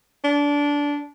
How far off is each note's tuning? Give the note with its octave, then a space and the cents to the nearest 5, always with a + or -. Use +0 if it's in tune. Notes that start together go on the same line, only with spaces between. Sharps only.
D4 -20